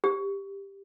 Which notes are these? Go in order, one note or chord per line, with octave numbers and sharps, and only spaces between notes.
G4